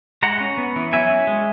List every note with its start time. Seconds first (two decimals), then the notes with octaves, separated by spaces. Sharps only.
0.23 G#3 F#5 A#5
0.40 C#4
0.58 B3
0.76 E3
0.93 F#3 E5 G#5
1.10 C#4
1.27 G#3